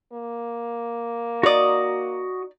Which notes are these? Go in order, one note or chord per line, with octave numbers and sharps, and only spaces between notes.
A#3
D#4 F#4 D5 D#6